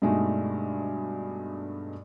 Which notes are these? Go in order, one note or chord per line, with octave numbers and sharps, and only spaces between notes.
G2 B2 G#3 A3 D#4